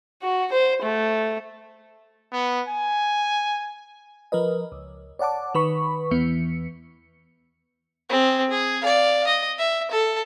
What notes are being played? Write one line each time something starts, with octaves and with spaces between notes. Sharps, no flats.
F#4
C5
A3
B3
G#5
F3 A#4 B4 D#5
C#2
C#5 D5 F#5 A5 D6
D#3 B4 B5 C#6
E2 E3 B3 C#7
C4 G#4
G#4
D5 F5
D#5
E5
A4